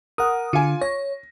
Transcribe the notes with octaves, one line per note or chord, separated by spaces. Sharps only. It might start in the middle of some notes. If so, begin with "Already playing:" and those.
A#4 F#5 D#6
D3 F4 G#5
C#5 A#6